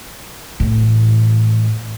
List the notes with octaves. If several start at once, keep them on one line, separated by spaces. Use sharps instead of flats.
A2 E3